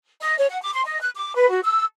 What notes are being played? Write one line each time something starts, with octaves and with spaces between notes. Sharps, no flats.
D#5
C#5
F#5
D6
C6
D#5
F#6
D6
B4
F#4
E6